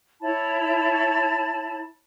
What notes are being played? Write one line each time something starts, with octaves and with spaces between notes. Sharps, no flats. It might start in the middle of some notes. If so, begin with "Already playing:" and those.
E4 C#5 A5 B5